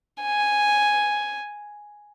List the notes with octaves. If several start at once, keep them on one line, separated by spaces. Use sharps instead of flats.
G#5